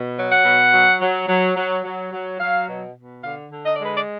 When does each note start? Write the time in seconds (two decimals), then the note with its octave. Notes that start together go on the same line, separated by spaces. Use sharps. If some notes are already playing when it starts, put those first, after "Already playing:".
Already playing: B2
0.18 F#3
0.32 F#5
0.45 B2
0.74 F#3
1.02 F#3
1.29 F#3
1.57 F#3
1.85 F#3
2.13 F#3
2.40 F#3 F5
2.68 B2
2.96 B2
3.24 D3 F5
3.52 D3
3.66 D#5
3.76 G#3 D5
3.86 B4
3.95 D5